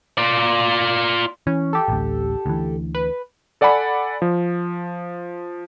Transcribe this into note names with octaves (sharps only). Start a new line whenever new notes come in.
F4 D5
E3 C#4
G4 A4
A1 D2
D2 E3
B4
A4 D5 F#5 G#5 B5
F3